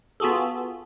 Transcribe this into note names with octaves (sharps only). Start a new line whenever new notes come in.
B3 F4 F#4 G#4 A4